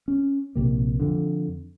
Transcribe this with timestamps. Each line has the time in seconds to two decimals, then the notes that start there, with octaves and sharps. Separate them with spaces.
0.08 C#4
0.55 A#1 C3 A#3
1.00 F2 D3